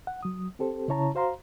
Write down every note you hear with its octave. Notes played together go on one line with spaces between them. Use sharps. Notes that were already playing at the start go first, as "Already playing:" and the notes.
F#5
F#3 D#6
C4 G4 A4 C5
C#3 C#4 E4 C#5 A5 A#5
F#4 C5 F5 A#5 C6